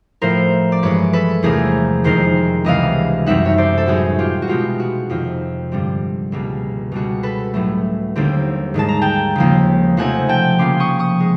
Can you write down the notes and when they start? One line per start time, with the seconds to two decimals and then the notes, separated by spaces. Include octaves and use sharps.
0.22 A2 F3 A3 A#4 C5
0.72 D5
0.82 G2 E3 G#3 B4 C#5
1.13 A4 B4
1.43 E2 C3 F3 A3 G#4 A#4
2.04 F2 C3 D#3 G#3 A#4 C5
2.65 C#2 C3 E3 G3 B3 D#5 F5
3.26 F#2 D#3 G3 C4 D#4 E5 F#5
3.46 C#5
3.58 C5 D5
3.78 A4
3.86 A2 F#3 B3 D#4 F#4 G#4
4.19 F4 G4
4.42 F#4
4.48 B2 G#3 B3 F4 G4
4.80 F#4
5.10 F2 C3 D#3 F4
5.72 G2 D3 G3 C4
6.32 C#2 B2 G3 A#3
6.92 C#2 B2 G3 F#4
7.23 A4 B4
7.54 A2 F#3 A3
8.16 D#2 D3 G3 C4
8.74 G#2 D#3 G#3 A5
8.89 A#5
9.02 G5 A5
9.36 D#2 C#3 F3 A#3
9.97 C3 F3 A3 C4 D#4 F#5 G#5
10.29 G5 A5
10.58 C#3 F3 A#3 C#4 C6 D6
10.80 C#6 D#6
10.99 C#6 D#6
11.20 G#3